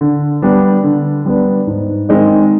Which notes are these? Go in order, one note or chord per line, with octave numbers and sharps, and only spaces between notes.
D3
G3 B3 D4
D3
G3 B3 D4
G#2
D#3 G#3 C4 D#4